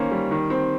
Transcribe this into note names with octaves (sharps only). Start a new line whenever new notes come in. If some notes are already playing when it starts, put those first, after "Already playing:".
Already playing: D#3 A#3 C#4 C5
G3
D#3
C4